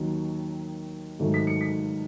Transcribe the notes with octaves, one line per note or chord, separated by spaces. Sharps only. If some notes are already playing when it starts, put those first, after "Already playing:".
Already playing: D#2 D#3 F#3
G#2 D#3 F#3 A3
B6
C#7
B6